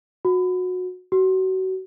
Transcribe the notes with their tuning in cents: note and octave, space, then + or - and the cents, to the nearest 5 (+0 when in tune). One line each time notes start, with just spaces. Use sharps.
F#4 -20
F#4 +30